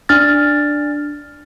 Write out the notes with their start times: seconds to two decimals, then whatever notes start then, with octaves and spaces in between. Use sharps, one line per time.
0.09 D4 F6 A6